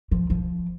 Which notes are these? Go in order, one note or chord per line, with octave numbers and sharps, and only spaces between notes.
F3
F3